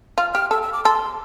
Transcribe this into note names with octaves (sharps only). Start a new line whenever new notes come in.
F4 F6
G4 F6
A4 E6
E6
D6
A4 C6